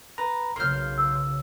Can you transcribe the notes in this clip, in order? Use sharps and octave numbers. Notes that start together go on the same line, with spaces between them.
B4 A#5
B1 C#3 A#3 C6 F6 G6
E6